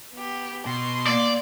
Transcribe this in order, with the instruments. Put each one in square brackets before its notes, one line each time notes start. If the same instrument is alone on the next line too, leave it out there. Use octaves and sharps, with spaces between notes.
[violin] B3 G4
[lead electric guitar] B2 [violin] C6
[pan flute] A#3 [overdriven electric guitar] D5